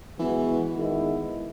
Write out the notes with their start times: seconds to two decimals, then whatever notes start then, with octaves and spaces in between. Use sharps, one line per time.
0.18 E3 G#3 B3 F#4
0.75 D#3 G#3 B3 E4